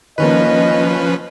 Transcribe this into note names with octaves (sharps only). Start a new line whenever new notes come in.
D#3 F3 A#3 C#4 B4 D#5